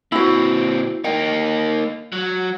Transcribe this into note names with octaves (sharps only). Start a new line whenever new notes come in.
A#2 C4 E4 F#4
A#3 D#4 G5
F#3